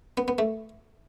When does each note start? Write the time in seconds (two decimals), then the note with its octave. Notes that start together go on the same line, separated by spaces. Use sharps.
0.17 B3
0.28 B3
0.38 A3